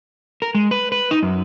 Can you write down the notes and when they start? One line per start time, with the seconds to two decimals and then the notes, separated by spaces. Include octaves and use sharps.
0.42 A#4
0.55 G#3
0.71 B4
0.92 B4
1.11 D#4
1.23 F#2